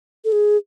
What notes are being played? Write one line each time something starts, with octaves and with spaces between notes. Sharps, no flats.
A4
G#4